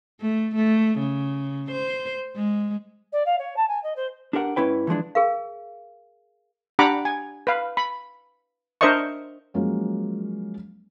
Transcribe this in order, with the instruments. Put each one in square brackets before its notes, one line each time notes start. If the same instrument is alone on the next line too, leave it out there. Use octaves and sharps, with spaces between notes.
[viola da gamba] A3
A3
C#3
C5
G#3
[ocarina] D5
F5
C#5
A5
G#5
D#5
C5
[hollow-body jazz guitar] D4 G4 A#4 F#5
G#2 C#4 E4 B4 G5
E3 F3 G#3 D4
[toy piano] G#4 A#4 F5
[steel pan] D4 G4 F#5 A#5 B5 D6
G#5
B4 F5
B5
D4 A#4 C5 D#5 E5 C#6
[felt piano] F3 F#3 G#3 A#3 C#4